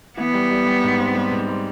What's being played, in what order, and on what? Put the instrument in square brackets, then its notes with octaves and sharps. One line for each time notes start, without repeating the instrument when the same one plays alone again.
[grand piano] E3 [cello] B3
[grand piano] G3
G3
G3
G#2
C4
G3
G#2
G3